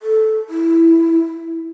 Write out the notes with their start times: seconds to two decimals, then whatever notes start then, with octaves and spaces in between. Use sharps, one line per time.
0.01 A4
0.49 E4